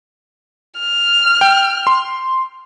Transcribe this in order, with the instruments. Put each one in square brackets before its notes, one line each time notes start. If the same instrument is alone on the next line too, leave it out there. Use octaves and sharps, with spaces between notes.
[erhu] F6
[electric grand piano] G5
C6